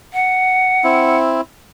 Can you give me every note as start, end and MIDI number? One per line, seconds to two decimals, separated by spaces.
0.13 1.18 78
0.84 1.41 60
0.84 1.41 64